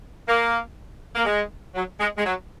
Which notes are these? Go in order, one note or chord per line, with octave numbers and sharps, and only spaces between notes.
A#3
A#3
G#3
F#3
G#3
G#3
F#3